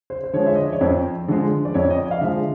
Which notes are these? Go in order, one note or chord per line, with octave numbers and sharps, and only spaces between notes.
C5
C5
D3 F3 G#3 C#5
E5
D#5
D5
C#5
F2 C5
D3 F3 G#3
D5
F2 C#5
D#5
D5
F5
D3 F3 G#3 E5